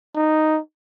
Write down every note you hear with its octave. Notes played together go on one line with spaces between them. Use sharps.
D#4